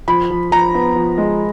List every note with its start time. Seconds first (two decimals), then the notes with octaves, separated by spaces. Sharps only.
0.08 F3 B5
0.30 F3
0.51 F3 A#5
0.75 B3
0.96 F3
1.18 G#3